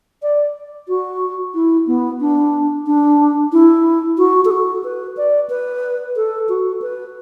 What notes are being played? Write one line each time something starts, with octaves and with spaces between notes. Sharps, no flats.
D5
F#4
E4
B3
D4
D4
E4
F#4
A4
F#4
B4
D5
B4
A4
F#4
B4